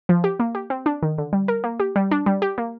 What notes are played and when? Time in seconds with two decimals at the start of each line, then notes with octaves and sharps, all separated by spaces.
0.09 F3
0.24 G4
0.40 A#3
0.55 G4
0.70 C4
0.86 D4
1.02 D#3
1.18 D3
1.33 G3
1.48 A#4
1.64 A#3
1.80 G4
1.96 G3
2.11 D4
2.26 G3
2.42 G4
2.58 A#3